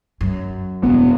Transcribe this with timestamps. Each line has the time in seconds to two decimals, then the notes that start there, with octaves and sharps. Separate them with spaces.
0.21 F#2
0.83 E1 D#2 B3